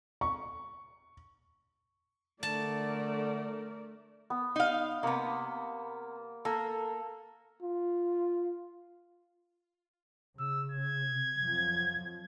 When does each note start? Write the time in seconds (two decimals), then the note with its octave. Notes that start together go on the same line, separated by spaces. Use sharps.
0.21 C#6
2.43 D3 A3 A#4 D5 A5
4.30 B3
4.56 D#4 F5
5.03 C3 A#3 B3
6.45 A#3 A4
7.62 F4
10.39 C#3 E6
10.72 G#6
11.11 C3
11.41 F2 F3 F#3